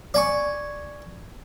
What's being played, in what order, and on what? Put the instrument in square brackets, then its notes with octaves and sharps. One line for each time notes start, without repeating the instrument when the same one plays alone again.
[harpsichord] D5 G#5 C#6